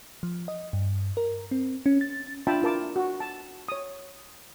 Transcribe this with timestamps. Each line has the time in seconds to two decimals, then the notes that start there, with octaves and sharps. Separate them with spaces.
0.23 F3
0.48 D#5
0.73 G2
1.17 A#4
1.51 C4
1.86 C#4
2.01 A6
2.47 D4 F4 E5 G5 A5 B5
2.62 E4 F4 A#4 A5 D6
2.96 F#4
3.20 A5
3.68 C#5 D#6